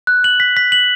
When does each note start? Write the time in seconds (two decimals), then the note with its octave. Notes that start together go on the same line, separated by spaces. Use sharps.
0.07 F#6
0.24 F#7
0.40 B6
0.57 B6
0.72 F#7